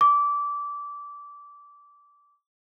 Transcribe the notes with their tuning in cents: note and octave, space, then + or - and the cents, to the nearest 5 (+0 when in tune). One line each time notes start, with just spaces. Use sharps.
D6 -20